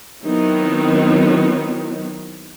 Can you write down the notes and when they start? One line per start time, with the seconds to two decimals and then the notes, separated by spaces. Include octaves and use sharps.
0.23 D#3 F#3 B3 C4 D#4 E4